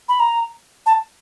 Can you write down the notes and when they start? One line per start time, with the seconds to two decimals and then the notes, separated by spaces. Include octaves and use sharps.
0.09 B5
0.20 A#5
0.86 A5